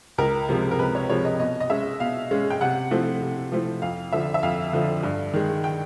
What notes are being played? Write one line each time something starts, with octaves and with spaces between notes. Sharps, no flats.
C#2 A#4
C3 F3 G#3 C4
A#4
C#2 B4
C#5
C3 F3 G#3 C4 C#5
D#5
B2 D#5
D#5
G#3 C#4 E5
B2 F5
G#3 C#4
G5
C3 F#5
F3 A3 C4 E4
C3
F3 A3 C4 E4
F2 F5
D3 F3 E5
E5
F2 F5
D3 F3
G2
D#3 G#3
G5